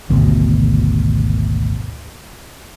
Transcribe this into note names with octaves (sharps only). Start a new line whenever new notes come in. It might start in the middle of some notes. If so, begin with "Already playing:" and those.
G#1 D2 B2